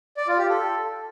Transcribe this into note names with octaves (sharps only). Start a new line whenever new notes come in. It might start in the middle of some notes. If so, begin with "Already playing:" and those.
D5
F4
G4
A4